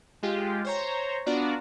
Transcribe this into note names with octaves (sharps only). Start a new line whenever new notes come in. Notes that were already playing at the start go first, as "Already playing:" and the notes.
G#3 F4 G4
C5 C#5 A#5
B3 D4 F4 F#4 D5 A#5